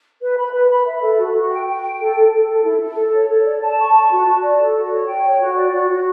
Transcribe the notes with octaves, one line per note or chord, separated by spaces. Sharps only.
B4
B5
B4
B5
E5
A4
F#4
F#4
G5
G5
G5
A4
A4
A4
A4
E4
A4
A4
C#5
A4
D5
A5
C#6
A5
F#4
F#4
D5
A4
F#4
C#5
G5
C#5
F#4
D5
F#4
F#4